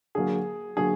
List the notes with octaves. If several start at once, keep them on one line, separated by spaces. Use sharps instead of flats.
D3 F#3 A#3 G#4
D3 F#3 A#3 G#4